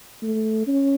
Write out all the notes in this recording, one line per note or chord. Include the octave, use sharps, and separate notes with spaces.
A3
C#4